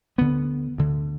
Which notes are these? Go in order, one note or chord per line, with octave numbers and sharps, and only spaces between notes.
D2 D3 B3
D2 D3